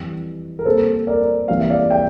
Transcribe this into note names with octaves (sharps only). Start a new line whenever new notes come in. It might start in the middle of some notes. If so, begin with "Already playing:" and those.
Already playing: F2 E3 G3
A#4
C3 G3 A#3 A4 C5
A#4 D5
C3 E3 G3 A#3 F5
E5
D5 F5
E5 G5